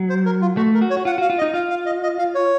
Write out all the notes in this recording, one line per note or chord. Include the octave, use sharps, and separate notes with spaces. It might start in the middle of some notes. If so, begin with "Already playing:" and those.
Already playing: F#3
C5
A#4
F4
A3 F#4
A#4
F#4
C#5
F#4
F4 F#5
F#4 F5
F4
D#5
D#4
F4 F5
F5
D#5
D#5
F5
C#5